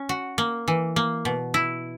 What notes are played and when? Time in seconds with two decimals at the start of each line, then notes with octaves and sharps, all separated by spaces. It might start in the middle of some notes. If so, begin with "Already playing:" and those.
Already playing: C#4
0.09 F#4
0.38 A#3
0.68 E3
0.96 A#3
1.25 B2
1.54 E4